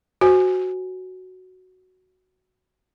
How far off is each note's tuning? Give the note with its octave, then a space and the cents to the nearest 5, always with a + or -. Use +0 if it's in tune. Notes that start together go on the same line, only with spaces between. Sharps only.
F#4 +0 C5 -10 G#5 +0